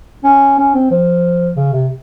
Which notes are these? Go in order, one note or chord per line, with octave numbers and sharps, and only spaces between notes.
C#4
C#4
C4
F3
C#3
C3